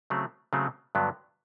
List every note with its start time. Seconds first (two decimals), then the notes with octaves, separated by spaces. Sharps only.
0.10 C#3 F#3 A3 C4
0.53 C#3 F#3 A3 C4
0.95 G2 D3 F#3 B3 D4